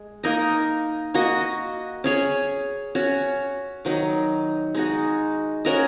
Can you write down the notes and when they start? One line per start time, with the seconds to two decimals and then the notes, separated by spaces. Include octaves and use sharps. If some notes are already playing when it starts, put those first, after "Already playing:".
Already playing: G#3
0.23 A#3 D#4 A#4 D#5
1.14 A#3 F#4 D#5
2.04 C#4 G#4 C#5
2.95 C#4 F#4 C#5
3.85 D#3 F#3 D#4
4.74 G#3 D#4 F#4
5.65 C#4 F#4 A#4 D#5